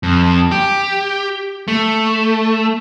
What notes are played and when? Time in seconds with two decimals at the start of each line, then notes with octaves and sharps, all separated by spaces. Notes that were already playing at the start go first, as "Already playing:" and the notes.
0.03 F2
0.52 G4
1.68 A3